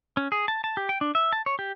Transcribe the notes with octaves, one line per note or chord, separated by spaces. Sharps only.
C#4
G#4
A5
A5
G4
G5
D4
E5
A5
C#5
G4